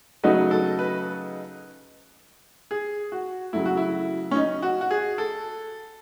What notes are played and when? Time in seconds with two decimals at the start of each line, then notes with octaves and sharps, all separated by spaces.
0.23 C#3 F#3 A3 D#4 F#4 B4
0.51 A4
0.79 B4
2.71 G#4
3.12 F#4
3.53 C#3 F#3 A3 E4
3.65 F#4
3.77 E4
4.31 C#4
4.36 D#4
4.63 F#4
4.81 F#4
4.91 G#4
5.18 A4